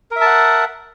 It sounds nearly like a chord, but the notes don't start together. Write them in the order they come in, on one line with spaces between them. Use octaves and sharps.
A#4 E5 A5 F#5